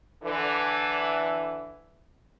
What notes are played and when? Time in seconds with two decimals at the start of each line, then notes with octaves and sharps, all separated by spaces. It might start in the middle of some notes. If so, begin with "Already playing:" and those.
0.23 D3 E3